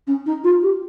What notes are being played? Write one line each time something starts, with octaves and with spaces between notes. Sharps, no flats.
C#4
D#4
F4
G4